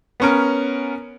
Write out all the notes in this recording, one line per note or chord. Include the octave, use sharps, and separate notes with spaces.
B3 C#4 A#4